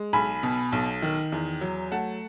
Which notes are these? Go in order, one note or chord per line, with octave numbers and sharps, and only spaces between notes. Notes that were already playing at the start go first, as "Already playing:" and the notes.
Already playing: G#3
B1 G#5 B5
B2
B1
D#3
E2
F#3
A3 F#5 A5